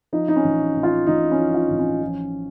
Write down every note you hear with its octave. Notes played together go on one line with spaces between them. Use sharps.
F3 D#4
D#4
C#4
A1
A2
F4
A1 D#4
C#4
F3
F4
A1
C#4
F3